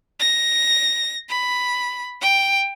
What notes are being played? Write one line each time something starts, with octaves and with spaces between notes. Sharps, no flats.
A#6
B5
G5